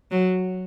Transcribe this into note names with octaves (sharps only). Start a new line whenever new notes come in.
F#3